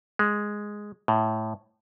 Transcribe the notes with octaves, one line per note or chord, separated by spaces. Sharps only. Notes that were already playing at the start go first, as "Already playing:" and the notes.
G#3
A2